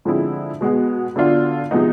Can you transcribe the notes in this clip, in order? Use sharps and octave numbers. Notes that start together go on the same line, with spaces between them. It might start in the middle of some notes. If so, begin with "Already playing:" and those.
D3 F3 G#3 C4 E4
B2 G#3 B3
D3 F#3 B3 D4 F4
C3 F3 G#3 B3 D#4